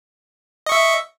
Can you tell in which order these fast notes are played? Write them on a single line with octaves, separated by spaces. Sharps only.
D#5 C#6 E5